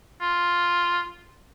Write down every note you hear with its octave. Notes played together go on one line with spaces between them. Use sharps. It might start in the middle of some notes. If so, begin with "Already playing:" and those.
F4